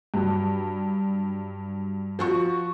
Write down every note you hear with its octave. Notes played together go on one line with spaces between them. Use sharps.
G2 F#3
F3 F#4 C#6